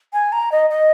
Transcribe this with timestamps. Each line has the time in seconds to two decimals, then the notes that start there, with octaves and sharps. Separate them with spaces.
0.13 G#5
0.32 A#5
0.52 D#5
0.70 D#5